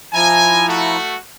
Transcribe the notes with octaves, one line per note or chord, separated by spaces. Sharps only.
F3 E4 G#5 A#5
A3 F#4